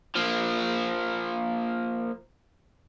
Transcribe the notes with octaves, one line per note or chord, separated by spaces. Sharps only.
F3 A#3